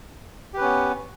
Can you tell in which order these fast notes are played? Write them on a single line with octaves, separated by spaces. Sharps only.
G4 B4 C#4 B3